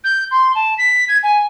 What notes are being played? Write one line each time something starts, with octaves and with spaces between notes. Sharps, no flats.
G6
C6
A5
B6
G#6
G#5